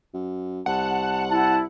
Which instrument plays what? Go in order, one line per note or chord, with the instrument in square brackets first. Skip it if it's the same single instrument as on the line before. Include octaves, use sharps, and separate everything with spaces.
[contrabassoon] F#2
[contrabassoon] C2 [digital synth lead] F#5 [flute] A5
[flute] E4 [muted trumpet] A5